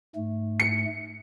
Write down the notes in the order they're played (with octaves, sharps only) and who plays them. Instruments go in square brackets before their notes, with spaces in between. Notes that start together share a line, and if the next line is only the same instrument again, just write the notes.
[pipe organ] G#2 A3
[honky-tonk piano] C#7